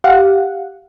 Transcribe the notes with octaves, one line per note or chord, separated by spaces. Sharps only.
G4 F5 F#5